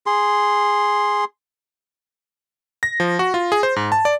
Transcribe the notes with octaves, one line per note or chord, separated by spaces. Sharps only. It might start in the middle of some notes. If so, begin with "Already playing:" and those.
G#4 C6
A#6
F3
F#4
F4
G#4
C5
G#2
A5
D5